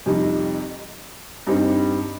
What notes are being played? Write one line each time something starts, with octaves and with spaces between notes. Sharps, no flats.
F2 C3 G3 D#4
G2 G3 C4 D#4